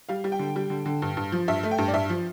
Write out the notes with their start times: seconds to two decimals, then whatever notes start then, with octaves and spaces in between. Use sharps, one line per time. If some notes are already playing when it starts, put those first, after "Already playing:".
0.09 G3 F5
0.24 G3
0.32 G5
0.39 D3
0.56 G3
0.70 D3
0.86 D3
1.02 G2
1.17 G2
1.32 F3
1.48 G2 E5
1.63 A3
1.71 G5
1.78 G2
1.88 D5
1.94 G2 E5
2.10 F3